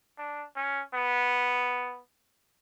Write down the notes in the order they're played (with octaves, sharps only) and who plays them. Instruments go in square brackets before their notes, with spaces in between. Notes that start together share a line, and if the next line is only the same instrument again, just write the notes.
[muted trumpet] D4
C#4
B3